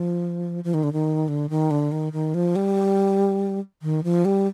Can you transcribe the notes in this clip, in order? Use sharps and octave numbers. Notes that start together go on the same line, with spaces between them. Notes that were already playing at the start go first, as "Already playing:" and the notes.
Already playing: F3
F3
D#3
D3
D#3
D3
D#3
D3
D#3
D#3
F3
G3
D#3
F3
G3